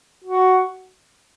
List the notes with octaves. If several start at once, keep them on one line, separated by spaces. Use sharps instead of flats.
F#4